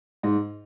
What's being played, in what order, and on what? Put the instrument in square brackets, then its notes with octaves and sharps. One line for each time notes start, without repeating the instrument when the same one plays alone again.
[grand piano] G#2